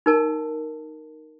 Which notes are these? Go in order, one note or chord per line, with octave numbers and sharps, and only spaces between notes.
D#4 A#4 A5